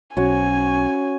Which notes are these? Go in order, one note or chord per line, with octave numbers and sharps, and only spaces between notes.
B1 C#4 F#4 C#5 G#5